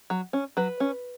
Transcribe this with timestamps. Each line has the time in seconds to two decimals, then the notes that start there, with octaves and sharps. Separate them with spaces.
0.10 F#3
0.33 C#4
0.57 F#3 B4
0.80 C#4